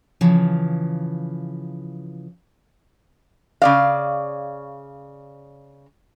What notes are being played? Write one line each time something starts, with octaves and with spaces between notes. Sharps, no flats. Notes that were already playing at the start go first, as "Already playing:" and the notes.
C#3 E3 F3
C#3 D5 F5